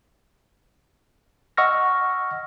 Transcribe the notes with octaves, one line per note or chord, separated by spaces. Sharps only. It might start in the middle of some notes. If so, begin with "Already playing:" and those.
D#5 F#5 C#6 E6 F6 A#6